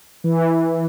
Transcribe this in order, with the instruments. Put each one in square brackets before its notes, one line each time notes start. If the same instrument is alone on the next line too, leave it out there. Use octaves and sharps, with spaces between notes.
[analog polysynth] E3